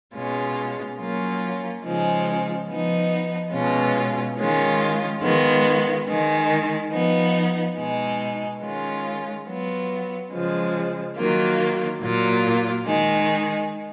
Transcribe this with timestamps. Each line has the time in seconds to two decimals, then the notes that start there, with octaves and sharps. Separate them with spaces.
0.13 B2 G#3 C#4 F4
0.98 F#3 A#3 C#4 F4
1.83 C#3 F3 G#3 D#4
2.68 F3 B3 D#4
3.52 B2 G#3 C#4 F4
4.38 D#3 G#3 C#4 F4
5.22 D#3 G#3 B3 F4
6.08 D#3 G#3 D#4
6.92 F3 B3 D#4
7.77 B2 G#3 D#4
8.62 D#3 G#3 C#4 F4
9.47 F#3 B3 F4
10.31 C#3 F3 G#3
11.16 D#3 F#3 A#3 F4
12.02 A#2 F#3 A#3 F4
12.86 D#3 G#3 D#4